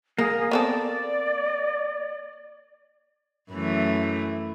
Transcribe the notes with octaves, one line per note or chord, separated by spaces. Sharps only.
A#3 G#4
B3 C4 A4 D5
F#2 E3 A3